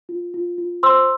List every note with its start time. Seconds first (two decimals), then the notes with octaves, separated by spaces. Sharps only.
0.09 F4
0.34 F4
0.58 F4
0.83 C5 C6 E6